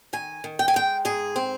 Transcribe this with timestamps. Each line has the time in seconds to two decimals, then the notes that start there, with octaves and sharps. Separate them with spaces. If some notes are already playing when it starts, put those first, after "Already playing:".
0.13 D#3 G#5
0.44 D#3
0.59 G5
0.68 G#5
0.74 G#3 G5
1.05 G#2 G#4
1.36 C4